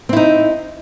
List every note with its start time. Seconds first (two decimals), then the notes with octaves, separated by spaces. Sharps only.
0.09 C4
0.13 E4
0.17 D#4